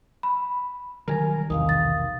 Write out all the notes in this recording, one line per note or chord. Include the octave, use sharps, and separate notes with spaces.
B5
D#3 F#3 G3 A#4 G#5 A#5
B1 E2 C3 D#3 F5 D#6
A6